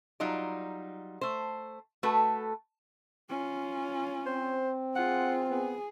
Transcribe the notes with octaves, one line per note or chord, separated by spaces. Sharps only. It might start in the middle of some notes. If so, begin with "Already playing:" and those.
F#3 G3 D#4 F4 D5
A3 C5
A3 F#4 A4 B4
C#4 F4
C4 C5
F4 G#4 F#5
B3 G#4